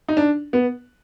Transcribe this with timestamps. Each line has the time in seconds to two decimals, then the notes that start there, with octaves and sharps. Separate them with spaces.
0.08 D#4
0.17 D4
0.53 B3